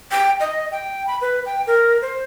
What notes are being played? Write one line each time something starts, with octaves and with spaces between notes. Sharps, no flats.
G5
D#5
G5
B5
B4
G5
A#4
C5